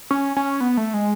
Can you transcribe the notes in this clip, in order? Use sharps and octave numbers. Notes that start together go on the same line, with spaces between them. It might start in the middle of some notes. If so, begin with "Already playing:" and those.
C#4
C#4
B3
A3
G#3